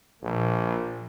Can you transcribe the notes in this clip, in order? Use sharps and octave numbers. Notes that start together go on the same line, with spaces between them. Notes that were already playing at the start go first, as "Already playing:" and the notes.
A#1 A#2 F3 A#3